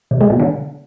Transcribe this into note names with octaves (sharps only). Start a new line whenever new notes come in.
C3
G#3
B2
D3